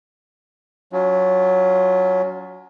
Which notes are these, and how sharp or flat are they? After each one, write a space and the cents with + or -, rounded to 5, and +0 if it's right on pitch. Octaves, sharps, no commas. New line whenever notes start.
F#3 +0 C#4 +35 F4 +0